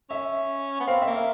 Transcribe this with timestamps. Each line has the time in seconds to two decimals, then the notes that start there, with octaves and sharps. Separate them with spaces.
0.10 C#4 E5
0.80 B3
0.87 C4 F5
1.02 E5
1.07 A#3
1.14 F5